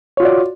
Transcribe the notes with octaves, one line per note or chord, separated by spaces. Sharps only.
F4 F#4 C#5 D5